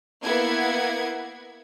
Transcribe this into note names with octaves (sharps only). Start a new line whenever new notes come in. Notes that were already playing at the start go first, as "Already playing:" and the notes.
A#3 B3 E4 G#6